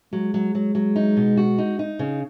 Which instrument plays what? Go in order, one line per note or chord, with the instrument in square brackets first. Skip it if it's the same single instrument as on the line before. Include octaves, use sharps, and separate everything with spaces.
[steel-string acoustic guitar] F#3 [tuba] G#3
[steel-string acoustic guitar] F#3
F#3
F#3
D#4
B2
F#4
D#4
D#4
C#3